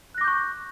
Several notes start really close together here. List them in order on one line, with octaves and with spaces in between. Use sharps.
F#6 A#6 D6 G6 C#6